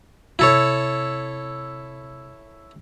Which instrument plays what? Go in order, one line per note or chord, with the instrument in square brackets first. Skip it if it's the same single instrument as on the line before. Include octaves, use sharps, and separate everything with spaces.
[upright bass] C3 [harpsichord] E4 A4 C#5